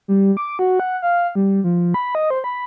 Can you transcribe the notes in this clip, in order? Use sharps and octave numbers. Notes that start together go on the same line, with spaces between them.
G3
D6
F#4
F#5
F5
G3
F3
B5
D#5
C5
B5